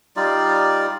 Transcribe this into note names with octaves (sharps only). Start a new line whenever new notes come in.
G3 D#4 F4 D5